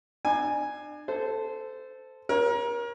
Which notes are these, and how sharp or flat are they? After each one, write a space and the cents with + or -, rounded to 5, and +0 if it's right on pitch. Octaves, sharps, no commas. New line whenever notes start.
D4 +35 G#5 +0
A4 +0 C5 -20
A#4 +30 C#5 -10